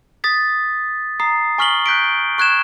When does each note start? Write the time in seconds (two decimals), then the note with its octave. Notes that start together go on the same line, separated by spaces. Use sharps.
0.24 D#6 A6 B6
1.20 A#5 D#6 C7
1.58 G#5 C#6 F6 B6 F#7 G7
1.86 F#6 G6 B6 D7
2.38 C#6 F#6 G#6 E7